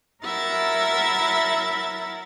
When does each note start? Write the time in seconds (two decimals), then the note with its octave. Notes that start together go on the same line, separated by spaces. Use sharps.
0.24 F#3 E4 A#4 E5 F#5 A6